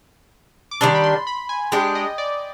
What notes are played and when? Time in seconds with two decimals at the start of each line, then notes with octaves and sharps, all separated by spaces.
0.71 D6
0.81 D#3 G3 D4 C6
0.95 B5
1.04 C6
1.27 B5
1.49 G#5
1.72 G#3 D4 G4 G5
1.95 D#5
2.18 D5